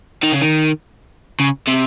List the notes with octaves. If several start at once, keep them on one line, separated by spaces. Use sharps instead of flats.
D#3
C#3
D#3
C#3
C3